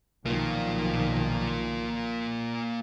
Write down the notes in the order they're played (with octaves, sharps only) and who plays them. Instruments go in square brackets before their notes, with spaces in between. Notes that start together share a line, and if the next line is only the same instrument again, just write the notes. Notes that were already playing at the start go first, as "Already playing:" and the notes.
[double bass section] B1 D#3 F3 [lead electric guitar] A#3 F4